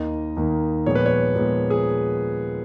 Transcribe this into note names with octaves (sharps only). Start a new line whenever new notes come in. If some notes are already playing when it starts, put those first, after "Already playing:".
Already playing: D#2 D#3 A#3 D#5
D#2 D#3 A#3
A#2 F3 G#3 B3 C#5
B4
C#5
A#2 F3 G#3 B3
G#4